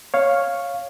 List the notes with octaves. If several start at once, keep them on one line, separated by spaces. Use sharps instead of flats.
C#5 F5